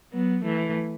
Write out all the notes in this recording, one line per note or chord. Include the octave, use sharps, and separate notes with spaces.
F#3 B3
E3 A3